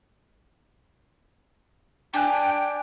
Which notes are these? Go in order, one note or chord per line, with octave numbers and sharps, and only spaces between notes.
D4 G5 G#5 F#6